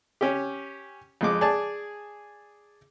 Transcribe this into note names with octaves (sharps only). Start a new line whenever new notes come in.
C#4 G4
F2 G#3 D6
G#4 D5 A5